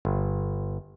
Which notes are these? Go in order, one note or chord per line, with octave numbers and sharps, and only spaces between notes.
G1